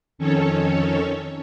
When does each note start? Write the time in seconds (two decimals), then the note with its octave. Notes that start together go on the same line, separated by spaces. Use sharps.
0.18 F2 D#3 C#4 A4 C#5